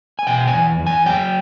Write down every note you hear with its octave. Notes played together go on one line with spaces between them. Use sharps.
G#5
B2 G5
G#5
E2
E2
G#5
F#3 G5